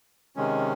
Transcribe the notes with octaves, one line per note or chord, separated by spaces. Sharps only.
C3 D#3 G#3 C#4